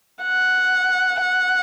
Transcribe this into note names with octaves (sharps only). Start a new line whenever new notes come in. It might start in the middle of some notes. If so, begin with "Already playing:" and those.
F#5
F#5